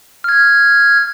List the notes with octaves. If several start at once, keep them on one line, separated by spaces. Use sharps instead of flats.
F6 G#6